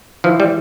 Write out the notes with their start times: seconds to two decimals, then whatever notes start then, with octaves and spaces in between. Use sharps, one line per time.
0.24 E3 F3
0.40 G3